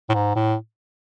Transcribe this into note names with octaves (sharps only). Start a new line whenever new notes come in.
A2
G#2
A2